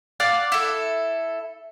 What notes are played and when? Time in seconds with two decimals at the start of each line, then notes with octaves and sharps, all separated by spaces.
0.20 D5 F5 F#5 D6
0.52 E4 A4